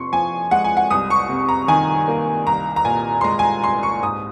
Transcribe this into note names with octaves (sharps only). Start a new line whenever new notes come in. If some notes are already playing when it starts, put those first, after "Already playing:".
Already playing: F2 C3 C6 C#6
F3 G#5
G#3 F#5
G#5
F#5
C2 D#6
C#6
C3
A#5
D#3 G#5
A#3
C2 A#5
A#5
A#2 G#5
C6
G#3 A#5
G#5
A#5
C2 C6
C#6
G#2 D#6